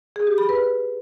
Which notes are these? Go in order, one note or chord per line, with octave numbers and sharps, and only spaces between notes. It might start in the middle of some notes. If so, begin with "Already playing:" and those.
G#4
G4
B5
B4